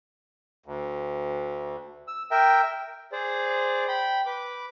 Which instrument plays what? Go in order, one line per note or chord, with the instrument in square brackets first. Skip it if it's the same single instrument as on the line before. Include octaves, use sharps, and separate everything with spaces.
[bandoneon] D2
E6
A#4 E5 G5
[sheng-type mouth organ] G#4 C5 D5
G5 B5
B4 D6